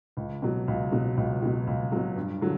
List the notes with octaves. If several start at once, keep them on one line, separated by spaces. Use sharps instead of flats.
C#2
B2 F#3
C#2
B2 F#3
C#2
B2 F#3
C#2
B2 F#3
G2
D3 F#3